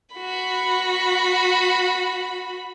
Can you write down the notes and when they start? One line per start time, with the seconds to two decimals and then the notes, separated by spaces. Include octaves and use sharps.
0.15 F#4 B5